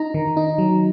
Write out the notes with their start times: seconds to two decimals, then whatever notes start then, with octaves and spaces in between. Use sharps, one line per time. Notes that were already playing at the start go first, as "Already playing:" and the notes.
Already playing: D#4 A#5
0.14 D#3
0.37 D#4
0.58 F#3